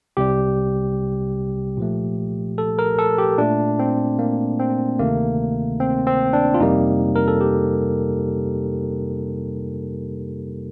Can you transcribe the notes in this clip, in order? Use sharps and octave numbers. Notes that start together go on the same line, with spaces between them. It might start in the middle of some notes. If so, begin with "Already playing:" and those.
C2 C3 G3 G4
A#2 F3 A3
A4
A#4
A4
G4
A#2 A3 D4
C4
A#3
C4
D2 C3 D#3 A3 A#3
C4
C4
D4
F4
F2 C3 G3 A#3 D#4
A#4
A4
G4